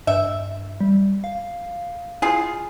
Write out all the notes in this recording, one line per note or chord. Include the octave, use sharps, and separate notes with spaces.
G2 E5
G3
F5
E4 F4 G#4